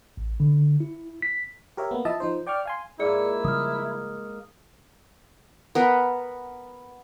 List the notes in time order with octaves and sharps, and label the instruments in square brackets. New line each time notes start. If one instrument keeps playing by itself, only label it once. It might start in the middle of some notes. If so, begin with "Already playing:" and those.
[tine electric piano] A1
D3
E4
B6
[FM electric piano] G4 A#4 C#5 E5
A#3 B3
F3 E4 D#5 E5 A5
F3 D#4 C5
D5 G5 C#6 D6 F6
F5 G#5 C6
[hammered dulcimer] G#2 A#3 F4 [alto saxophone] E4 [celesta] G#4 D5 C#7
[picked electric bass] C#3 F3 G3 [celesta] D#6 F6
[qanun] B3 A#4 B4